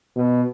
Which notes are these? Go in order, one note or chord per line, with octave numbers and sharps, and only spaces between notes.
B2